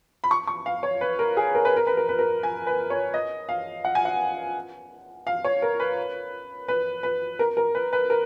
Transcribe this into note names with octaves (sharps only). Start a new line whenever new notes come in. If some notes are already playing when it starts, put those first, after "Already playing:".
B5
C#6
C#6
F5
C#5
B4
A#4
G#4
A#4
B4
A#4
B4
A#4
B4
A#4
G#5
B4
C#5
D#5
F5
F#5
G#5
F#5
F5
C#5
A#4
B4
B4
B4
A#4
A#4
B4
B4
A#4